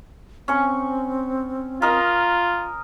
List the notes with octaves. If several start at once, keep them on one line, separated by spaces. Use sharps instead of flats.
C4 C#4 C#6
F4 A#4 D#5